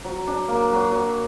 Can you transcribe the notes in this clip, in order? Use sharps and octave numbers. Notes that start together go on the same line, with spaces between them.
F#3
D4
A#3
F#3
F#3